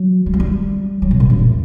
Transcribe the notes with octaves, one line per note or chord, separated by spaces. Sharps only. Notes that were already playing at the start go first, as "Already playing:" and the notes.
Already playing: F#3
G3
F#3
G3
F#3
B2
A#2
F#2
E2